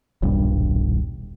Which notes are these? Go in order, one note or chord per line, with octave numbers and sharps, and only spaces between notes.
D#1 B1 G2